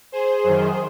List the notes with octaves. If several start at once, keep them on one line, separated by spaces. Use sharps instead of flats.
G#4 C5
F#2 D#3